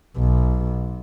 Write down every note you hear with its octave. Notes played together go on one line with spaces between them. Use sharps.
B1